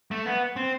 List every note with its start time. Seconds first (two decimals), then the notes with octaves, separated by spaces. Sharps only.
0.11 A3
0.26 B3
0.56 C4